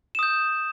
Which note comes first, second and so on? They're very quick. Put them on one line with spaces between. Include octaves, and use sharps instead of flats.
E7 D#6 G6